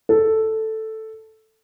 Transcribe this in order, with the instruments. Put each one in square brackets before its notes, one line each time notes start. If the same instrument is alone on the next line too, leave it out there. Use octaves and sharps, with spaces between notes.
[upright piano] A4